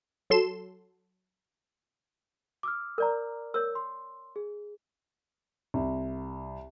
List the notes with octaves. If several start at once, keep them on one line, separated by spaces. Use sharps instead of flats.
F#3 A4 C6 E7
D6 E6 F6
A#4 D5 A#5
A#4 C#5 E6
C6
G#4
C2